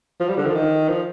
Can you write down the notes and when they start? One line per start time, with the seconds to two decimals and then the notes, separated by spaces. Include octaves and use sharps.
0.20 F3
0.29 G3
0.37 D3
0.46 F3
0.55 D#3
0.89 F3